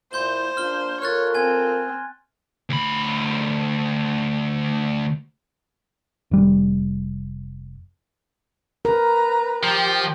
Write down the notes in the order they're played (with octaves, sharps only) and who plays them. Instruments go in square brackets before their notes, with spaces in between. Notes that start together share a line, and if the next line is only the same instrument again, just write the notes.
[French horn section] A#2 E4 [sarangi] C5 [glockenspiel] C6 G6 G7
[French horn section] A#3 D4 F4 [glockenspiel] F6 G7
[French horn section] F4 A4 A#4 [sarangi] C#5 [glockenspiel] F6 F#6 A6
[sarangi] C4 [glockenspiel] G#5 G#6
[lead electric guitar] D2 B5
[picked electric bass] F1 G3
[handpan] A#4 [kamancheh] B4 A#5
[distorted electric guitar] F3 [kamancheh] G4